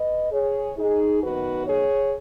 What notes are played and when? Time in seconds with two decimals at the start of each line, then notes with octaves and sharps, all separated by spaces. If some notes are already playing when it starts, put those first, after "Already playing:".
Already playing: B4 D#5
0.33 G#4 C#5
0.77 D#4 G#4
1.23 F#2 D#3 B3 F#4 B4
1.68 G#4 C#5